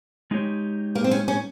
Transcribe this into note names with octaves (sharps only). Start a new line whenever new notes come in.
G#3 D#4 G4 C#5
A#3
C4
C#4
C#4